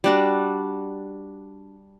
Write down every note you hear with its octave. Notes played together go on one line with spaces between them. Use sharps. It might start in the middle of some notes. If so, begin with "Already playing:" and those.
G3 D4 F#4